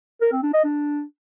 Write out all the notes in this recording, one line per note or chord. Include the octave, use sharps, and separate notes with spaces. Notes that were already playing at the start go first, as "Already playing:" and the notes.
A#4
C4
D4
D#5
D4